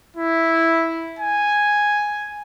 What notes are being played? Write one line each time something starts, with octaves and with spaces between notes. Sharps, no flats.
E4
G#5